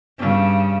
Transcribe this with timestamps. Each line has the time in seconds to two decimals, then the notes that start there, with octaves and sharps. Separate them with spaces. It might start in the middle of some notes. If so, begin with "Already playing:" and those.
0.18 G2 C#3